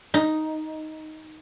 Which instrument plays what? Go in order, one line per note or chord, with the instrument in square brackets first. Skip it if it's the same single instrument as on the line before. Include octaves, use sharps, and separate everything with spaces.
[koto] D#4